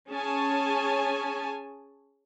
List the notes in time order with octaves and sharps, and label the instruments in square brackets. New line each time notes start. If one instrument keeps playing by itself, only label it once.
[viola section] C#4 G#4 C#5 G#5 A5